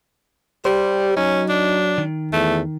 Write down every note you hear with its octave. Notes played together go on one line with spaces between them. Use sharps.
G3 G4 C5
F#3 C#4 D#4
D4
D#3
E2 A3